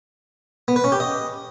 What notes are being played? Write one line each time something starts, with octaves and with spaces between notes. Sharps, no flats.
B3
B4
C#4
G4
D#5